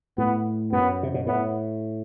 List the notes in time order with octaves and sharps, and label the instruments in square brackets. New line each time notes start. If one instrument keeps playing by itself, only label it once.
[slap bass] A2 [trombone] B3
[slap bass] F#2 [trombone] B3
[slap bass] C3
B2
[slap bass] A2 [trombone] B3